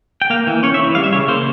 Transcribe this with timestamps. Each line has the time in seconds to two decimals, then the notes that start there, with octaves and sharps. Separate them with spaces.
0.22 G5
0.30 A#3 F5
0.47 E3
0.63 C#4 C#5
0.74 E5
0.80 E3
0.95 G3 F5
1.04 E5
1.12 C#3 C#5
1.28 A#3 C5